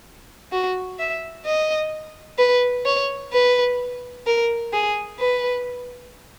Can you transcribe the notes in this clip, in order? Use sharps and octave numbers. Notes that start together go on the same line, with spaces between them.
F#4
E5
D#5
B4
C#5
B4
A#4
G#4
B4